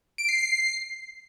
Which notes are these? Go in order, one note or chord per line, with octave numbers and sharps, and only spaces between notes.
D7
C7
C7